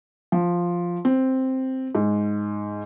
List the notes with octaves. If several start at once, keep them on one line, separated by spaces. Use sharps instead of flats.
F3
C4
G#2